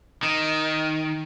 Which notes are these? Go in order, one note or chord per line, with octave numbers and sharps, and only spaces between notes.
D#3